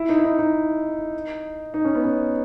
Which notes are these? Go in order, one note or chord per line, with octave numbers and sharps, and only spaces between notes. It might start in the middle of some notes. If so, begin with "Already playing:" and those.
Already playing: E4
D#4
E4
D#4
D#4
D#4
C#4
B3
C#4